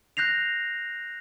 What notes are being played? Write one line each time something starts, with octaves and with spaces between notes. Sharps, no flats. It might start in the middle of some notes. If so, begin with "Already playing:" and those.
F#6 G6 A#6 C7 F7